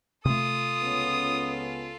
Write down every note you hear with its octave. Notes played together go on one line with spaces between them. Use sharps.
C3 A3 F4 A4 D#6
C#2 B3 C#4